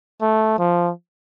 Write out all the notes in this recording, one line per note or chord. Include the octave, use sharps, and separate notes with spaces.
A3
F3